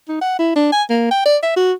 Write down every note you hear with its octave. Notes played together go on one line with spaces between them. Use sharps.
D#4
F#5
E4
D4
G#5
A#3
G5
D5
E5
F#4